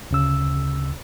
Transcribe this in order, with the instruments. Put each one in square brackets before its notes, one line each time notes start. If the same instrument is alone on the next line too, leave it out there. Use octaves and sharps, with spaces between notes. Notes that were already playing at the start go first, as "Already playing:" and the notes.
[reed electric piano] D2 C#3 E6